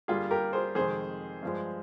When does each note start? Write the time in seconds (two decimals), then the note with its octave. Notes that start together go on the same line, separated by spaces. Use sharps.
0.08 G2 D3 G3 A#3 F4 G#4
0.30 G4 A#4
0.53 G#4 C5
0.75 F2 C3 D#3 G#3 G#4 C5
1.43 G2 F3 G#3